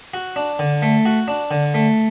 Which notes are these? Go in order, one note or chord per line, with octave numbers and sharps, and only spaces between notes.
F#4
D4
D3
A3
F#4
D4
D3
A3